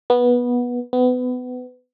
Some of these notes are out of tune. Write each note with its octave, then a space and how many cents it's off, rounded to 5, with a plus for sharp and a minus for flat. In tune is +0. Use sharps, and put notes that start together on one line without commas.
B3 -15
B3 +25